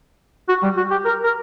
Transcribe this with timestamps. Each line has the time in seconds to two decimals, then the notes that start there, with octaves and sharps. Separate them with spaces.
0.49 F#4
0.63 G3
0.77 F#4
0.91 G4
1.05 A#4
1.24 A#4